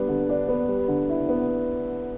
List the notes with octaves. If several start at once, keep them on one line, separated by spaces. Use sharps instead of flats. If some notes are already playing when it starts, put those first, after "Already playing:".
Already playing: G3 B3 D4
D3
D4
B3
G3
D3
E4
B3